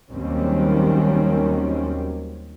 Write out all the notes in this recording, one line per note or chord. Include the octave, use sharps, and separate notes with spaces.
D#2 D#3 F#3 G3 C4 C#4